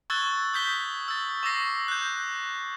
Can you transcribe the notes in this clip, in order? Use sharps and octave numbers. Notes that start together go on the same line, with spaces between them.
C#6 E6 F#6 G#6 A6 G7
D#6 G6 B6 G7
G7
E6 A6
C#6 D6 E6 A#6 C7
F#6 G6